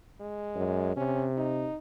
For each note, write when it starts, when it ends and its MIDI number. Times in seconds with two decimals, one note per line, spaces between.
0.21 0.96 56
0.55 0.94 42
0.97 1.68 48
0.97 1.27 61
1.37 1.77 63